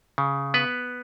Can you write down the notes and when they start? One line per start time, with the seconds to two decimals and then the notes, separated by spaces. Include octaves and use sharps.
0.18 C#3
0.54 B3 B4